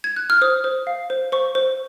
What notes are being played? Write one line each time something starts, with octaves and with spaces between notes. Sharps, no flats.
G#6
F#6
F6
C5 D#6
C5
F5
C5
C5 C#6
C5